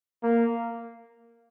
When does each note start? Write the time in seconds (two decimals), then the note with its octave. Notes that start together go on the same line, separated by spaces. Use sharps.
0.23 A#3